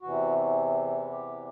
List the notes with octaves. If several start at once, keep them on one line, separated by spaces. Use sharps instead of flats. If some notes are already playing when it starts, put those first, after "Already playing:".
E2 C3 E3 F#4
G4